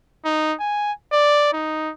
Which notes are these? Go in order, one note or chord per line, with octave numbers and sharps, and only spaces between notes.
D#4
G#5
D5
D#4